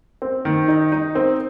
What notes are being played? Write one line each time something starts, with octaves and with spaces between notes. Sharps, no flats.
C4
D#3
D#4
D#4
C4